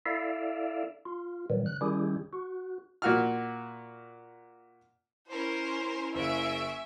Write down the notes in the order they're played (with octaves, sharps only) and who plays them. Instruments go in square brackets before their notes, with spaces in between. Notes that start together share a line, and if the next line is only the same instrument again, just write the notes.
[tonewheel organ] E4 A4 D5 E5 F5
F4
A#2 D#3 E3 F#3 G3
C#3 F#6
D#3 G3 C#4 E4 G4 G#4
F#4
[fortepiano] A#2 F#4 F6
[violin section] C#4 A#4 [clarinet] E4 [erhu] C5
[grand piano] F#1 C5 [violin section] G#4 C#6 D7 [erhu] E5